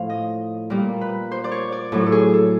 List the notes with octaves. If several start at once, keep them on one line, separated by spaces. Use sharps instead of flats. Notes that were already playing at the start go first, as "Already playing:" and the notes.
Already playing: A2 F3 F5
D#5
A#2 G3 A#4
B4
C5
D5
C#5
D5
A2 F#3 A4
A4
G#4
A4